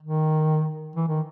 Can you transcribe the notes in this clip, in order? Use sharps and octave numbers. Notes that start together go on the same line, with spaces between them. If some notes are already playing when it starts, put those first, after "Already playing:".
D#3
E3
D#3